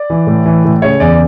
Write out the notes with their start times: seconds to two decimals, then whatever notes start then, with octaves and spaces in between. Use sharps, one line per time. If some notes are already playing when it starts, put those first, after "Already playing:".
Already playing: D5
0.10 E3
0.27 A2
0.46 E3
0.65 A2
0.82 C#3 C#5
1.00 E2 D5